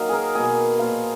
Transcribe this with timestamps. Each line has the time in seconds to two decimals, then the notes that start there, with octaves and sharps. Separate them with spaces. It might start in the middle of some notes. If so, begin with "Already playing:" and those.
Already playing: D#3 F#3 A#3 D#5 F5
0.09 G#4 A#4
0.35 B2 A#3 G#4
0.79 A#2 F3 A#3 F5